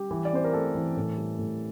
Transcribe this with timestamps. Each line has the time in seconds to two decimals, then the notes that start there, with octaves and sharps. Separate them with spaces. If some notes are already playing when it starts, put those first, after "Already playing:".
Already playing: G3 G4
0.11 E3
0.25 D5
0.33 C4 C5
0.44 A#4
0.53 A3 A4
0.75 E3
0.96 A2
1.17 G3
1.38 A2